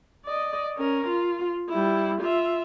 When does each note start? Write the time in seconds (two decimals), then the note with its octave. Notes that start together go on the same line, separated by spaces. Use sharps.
0.25 D5 D#5
0.78 C#4 A#4
1.07 F4
1.69 G3 E4
2.21 F4 E5